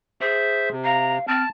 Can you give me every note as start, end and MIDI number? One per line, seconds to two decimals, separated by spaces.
0.21 0.73 68
0.21 0.69 72
0.21 0.69 76
0.71 1.18 48
0.84 1.25 77
0.84 1.16 82
1.28 1.44 60
1.28 1.49 81
1.28 1.43 89